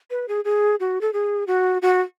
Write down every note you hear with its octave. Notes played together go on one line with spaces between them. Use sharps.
B4
G#4
G#4
F#4
A4
G#4
F#4
F#4